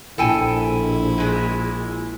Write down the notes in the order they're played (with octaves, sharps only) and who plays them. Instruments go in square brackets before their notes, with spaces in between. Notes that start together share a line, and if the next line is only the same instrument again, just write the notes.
[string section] A#1 [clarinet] E4 [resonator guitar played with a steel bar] A4 G5 G#5
[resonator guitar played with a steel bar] A#2 G#3